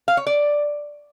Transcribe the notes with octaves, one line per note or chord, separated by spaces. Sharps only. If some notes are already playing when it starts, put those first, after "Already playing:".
F5
C#5
D5